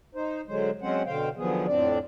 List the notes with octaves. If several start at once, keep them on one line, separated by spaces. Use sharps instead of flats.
D#4 C5
D3 F#3 G#3 C5
F#3 G#3 C4 C#4 C5 F#5
B2 D3 C5 F5 G5
D3 D#3 F3 F#3 B3 G#4
F2 A2 D3 C4 D4 D5